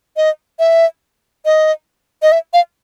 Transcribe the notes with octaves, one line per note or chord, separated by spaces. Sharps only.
D#5
E5
D#5
D#5
E5
F5